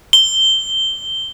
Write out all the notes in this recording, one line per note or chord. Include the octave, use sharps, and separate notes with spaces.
G7